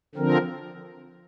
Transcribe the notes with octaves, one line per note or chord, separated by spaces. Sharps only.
D3 F3 C4 A#4